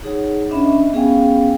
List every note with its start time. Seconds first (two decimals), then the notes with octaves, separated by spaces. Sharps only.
0.03 D#4 G#4 C#5 F#5
0.50 C#4 D4 D#5 E5 B5
0.92 B3 C#4 G#4 F5 G5 G#5